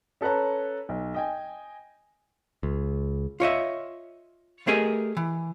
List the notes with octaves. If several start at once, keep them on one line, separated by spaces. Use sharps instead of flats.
C#4 A4 B4 C#5 A#5
B1
D#5 G5 G#5
C#2
F4 C#5 D#5 E5
A3 G4 G#4 A#4 D#5 G#5
E3